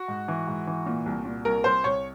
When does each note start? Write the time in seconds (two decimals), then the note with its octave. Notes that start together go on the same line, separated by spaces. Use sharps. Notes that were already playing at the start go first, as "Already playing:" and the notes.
Already playing: F#4
0.08 G#2
0.28 E3
0.47 G#2
0.67 E3
0.86 A#2
1.06 C2
1.25 A#2
1.45 C2 A#4
1.64 C2 C5
1.84 C2 C#5